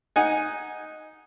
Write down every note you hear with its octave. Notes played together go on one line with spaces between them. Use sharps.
D#4 F#5 G#5